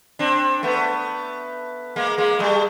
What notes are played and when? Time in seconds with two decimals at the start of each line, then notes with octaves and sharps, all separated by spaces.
0.19 C4 D4
0.63 A3 B3
1.96 G#3 A#3
2.18 G#3 A#3
2.39 G3 A3